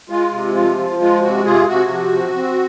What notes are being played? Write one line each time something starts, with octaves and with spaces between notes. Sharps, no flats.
G#3 F4
C3
F3 F4
F3
G#3 F4
C3 F#4
C3 F4 G#4
C3 F#4
F3
C4
C4